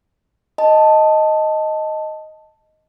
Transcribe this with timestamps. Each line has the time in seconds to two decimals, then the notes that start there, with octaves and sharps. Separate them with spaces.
0.58 D#5 A5